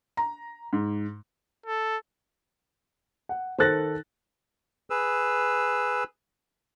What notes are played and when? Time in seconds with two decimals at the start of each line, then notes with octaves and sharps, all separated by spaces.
0.17 A#5
0.73 G#2
1.66 A4
3.29 F#5
3.58 D#3 A4 C5 F#6 A6 A#6
4.90 G#4 B4 E6